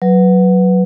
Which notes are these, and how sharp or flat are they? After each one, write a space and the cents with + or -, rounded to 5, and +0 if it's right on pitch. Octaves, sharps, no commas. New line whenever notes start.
F#3 +0 B4 +5